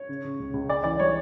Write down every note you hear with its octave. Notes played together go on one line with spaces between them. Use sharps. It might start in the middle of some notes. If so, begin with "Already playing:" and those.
Already playing: C#5
C#3
C#3
C#2
C#2
C#3 D5
E3 D5
G3 C#5